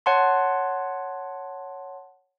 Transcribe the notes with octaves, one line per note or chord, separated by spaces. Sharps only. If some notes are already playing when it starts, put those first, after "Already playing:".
C#5 F#5 A5 C6